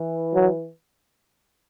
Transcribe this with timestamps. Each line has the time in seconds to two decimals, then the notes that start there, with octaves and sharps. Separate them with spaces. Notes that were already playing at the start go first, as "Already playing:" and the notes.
Already playing: E3
0.34 F#3